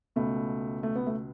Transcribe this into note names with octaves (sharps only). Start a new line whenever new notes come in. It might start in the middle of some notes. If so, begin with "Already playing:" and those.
C#2 B2 A3
A3
B3
A3